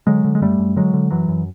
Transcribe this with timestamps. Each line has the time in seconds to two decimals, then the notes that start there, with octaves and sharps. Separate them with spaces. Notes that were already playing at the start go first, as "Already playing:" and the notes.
0.07 D3 F#3 G#3
0.25 D3
0.35 G#3
0.41 F#2 G3 A3
0.59 F#2
0.76 D3 F#3 G#3
0.93 D3
1.11 F#2 E3 F#3
1.28 F#2